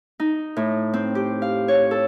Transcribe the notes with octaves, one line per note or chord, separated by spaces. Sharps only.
D#4
A2
C4
G4
F5
C#5
A4